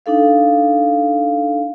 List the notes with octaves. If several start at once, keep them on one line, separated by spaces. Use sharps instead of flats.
D4 D#4 A4 F5